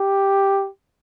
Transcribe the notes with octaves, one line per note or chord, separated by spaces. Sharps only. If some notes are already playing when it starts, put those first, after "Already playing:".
Already playing: G4